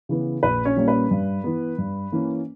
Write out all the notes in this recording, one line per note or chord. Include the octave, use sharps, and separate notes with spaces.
C#3 E3 B3
A#1 B4
C#4 C#5
A#2 G3 A#3 C#4
B4
G2
E3 B3
G2
E3 A#3 C#4